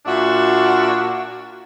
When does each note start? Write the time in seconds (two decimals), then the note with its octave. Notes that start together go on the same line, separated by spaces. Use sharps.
0.05 A#2 D4 F#4 E5